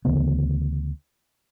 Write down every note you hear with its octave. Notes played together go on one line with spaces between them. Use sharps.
D2 C#3 E3 B3